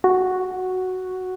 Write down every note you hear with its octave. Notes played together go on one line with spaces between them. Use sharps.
F#4